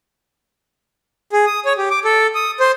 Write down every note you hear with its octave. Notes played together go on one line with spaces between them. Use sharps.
G#4
D#6
C#5
G4
D6
A4
D#6
C5